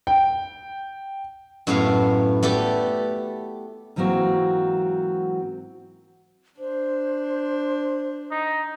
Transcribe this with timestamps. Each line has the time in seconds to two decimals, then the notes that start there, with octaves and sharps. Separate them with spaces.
0.07 G5
1.67 F#2 A2 B3 E5 F5
2.43 A3 B3 G4 A4 D5
3.96 G#2 E3 F#3 A#3 C4 F#4
6.59 D4 C5
8.31 D#4